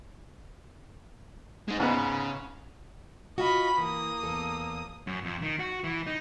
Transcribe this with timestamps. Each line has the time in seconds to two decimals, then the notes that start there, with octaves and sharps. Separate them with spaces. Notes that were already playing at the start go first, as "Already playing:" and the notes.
1.68 G#3 D#4
1.80 G#2 C#3 B3
3.38 F4 F#4 D#5 B5
3.78 E3 A#3 D#6
4.23 E2 A4
5.07 F#2
5.24 F2
5.42 D#3
5.59 F#4
5.84 E3
6.07 D#4